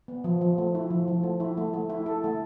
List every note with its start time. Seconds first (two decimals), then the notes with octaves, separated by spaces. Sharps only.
0.08 B3
0.24 F3
0.41 F3
0.58 A3
0.75 E4
0.90 F3
1.08 F3
1.23 A3
1.40 E4
1.58 A3
1.73 A3
1.90 E4
2.06 A4
2.24 A3